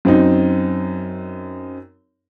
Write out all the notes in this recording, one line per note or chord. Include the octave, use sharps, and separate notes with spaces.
F#2 C4 D#4